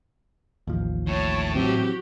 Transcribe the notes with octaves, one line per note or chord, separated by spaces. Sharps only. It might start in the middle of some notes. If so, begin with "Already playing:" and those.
A1 D#2 F3
A2 C#5 A5
E3 F#3 C4 F#4 G4